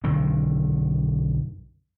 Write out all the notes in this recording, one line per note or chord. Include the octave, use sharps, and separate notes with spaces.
B1 F#2 D3 D#3